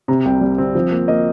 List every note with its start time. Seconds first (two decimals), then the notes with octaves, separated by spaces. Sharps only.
0.08 C3 A#5
0.25 C2 G5
0.41 G3
0.58 C4
0.75 F3
0.91 A#3
1.08 A#3 D#5